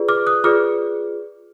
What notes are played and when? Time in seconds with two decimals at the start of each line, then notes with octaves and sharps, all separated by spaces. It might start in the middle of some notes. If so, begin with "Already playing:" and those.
Already playing: F4 G#4 B4 D5
0.08 D6 F6
0.27 D#6 F#6
0.44 F4 G#4 B4 D5 D6 F6